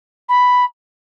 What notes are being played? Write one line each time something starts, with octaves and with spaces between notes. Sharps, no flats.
B5